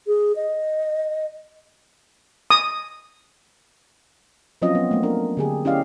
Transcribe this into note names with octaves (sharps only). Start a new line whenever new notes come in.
G#4
D#5
D#6
F3 F#3 C4 C#4 F4 D#5
B3
A3 A#3
D4 A#4
D3 G4 G#4
C#4 E4 G4 D5 D#5 F5